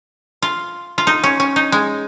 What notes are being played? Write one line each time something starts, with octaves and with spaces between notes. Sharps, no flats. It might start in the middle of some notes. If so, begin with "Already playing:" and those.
F4
F4
D#4
C#4
C#4
D#4
G#3